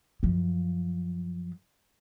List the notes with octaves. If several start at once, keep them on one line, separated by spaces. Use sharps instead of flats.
F#2 F3